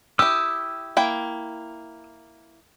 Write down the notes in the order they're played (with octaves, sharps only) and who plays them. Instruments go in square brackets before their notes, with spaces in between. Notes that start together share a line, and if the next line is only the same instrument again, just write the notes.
[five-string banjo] E4 G4 [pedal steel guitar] D#6 E6
[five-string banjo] A#3 E4 G5